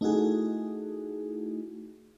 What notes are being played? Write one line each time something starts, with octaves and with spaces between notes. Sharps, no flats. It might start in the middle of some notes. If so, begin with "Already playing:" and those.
A3 D#4 E4 F#4 G#4